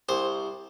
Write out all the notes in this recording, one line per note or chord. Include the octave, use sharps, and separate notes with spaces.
C2 C5